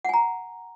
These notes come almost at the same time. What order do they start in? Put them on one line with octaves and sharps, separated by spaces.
F#5 G#5 A#5